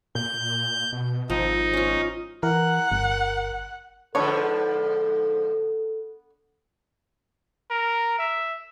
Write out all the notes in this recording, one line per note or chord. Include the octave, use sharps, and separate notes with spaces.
A#2 G6
B2
G#1 F3 C4 D#4
C#4 F4
E3 A#4 F#5
G1
G#2 D3 F3 B3 D4 A4 C#5
A#4
E5